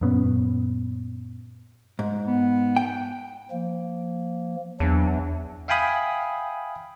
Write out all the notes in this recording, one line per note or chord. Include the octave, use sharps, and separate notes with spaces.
F#2 A#2 B3 C#4
G#2
B3
G5
F3 A#3
E2 F#3 D4
E5 F5 G5 G#5 B5 D#6